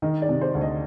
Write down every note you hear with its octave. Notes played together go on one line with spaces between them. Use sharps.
D#3 D#5
D5
C3
C5
D2
D#5